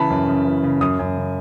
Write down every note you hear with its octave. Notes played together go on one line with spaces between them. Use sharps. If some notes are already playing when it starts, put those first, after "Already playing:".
Already playing: C#3 E3 A5 B5
F#2
C#3
E3
C#3
F#2 D#6
F#2
C#3